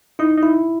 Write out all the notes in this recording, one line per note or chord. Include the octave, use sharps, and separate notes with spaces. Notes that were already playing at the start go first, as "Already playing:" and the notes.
D#4 E4
D#4
E4